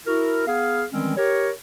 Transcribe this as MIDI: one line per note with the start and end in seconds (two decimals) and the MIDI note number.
0.07 0.43 64
0.07 0.43 66
0.07 0.43 70
0.47 0.84 59
0.47 0.84 68
0.47 0.84 77
0.92 1.17 51
0.92 1.17 52
0.92 1.17 55
0.92 1.17 56
0.92 1.17 60
0.92 1.17 61
1.17 1.50 67
1.17 1.50 70
1.17 1.50 73